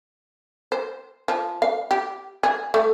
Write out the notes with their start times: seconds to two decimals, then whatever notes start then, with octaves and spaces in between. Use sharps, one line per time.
0.72 C5
1.28 F3
1.62 F5
1.91 G4
2.43 G#4
2.74 A3